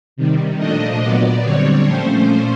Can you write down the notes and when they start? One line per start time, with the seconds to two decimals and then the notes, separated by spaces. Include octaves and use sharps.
0.16 C3 D#3 G3
0.58 A#2 F3 A3 D4 D#5
1.00 A#2 F#3 B3 D5
1.43 D3 G3 C4 C#5
1.86 A#2 F3 A3 C#4 C5